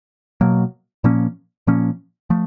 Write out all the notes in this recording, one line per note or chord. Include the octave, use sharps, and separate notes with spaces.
B2 F#3 A#3
A#2 F3 A#3 C#4
A#2 F3 A#3 C#4
F3 A3